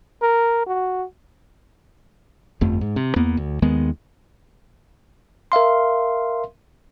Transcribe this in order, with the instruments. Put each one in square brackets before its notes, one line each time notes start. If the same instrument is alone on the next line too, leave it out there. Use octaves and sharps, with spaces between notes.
[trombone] A#4
F#4
[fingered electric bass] G1 F2 A3
G#2
C3
E2 A#3 B3
D2
D#2 D#3 G#3 B3
[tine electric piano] A#4 E5 F5 C6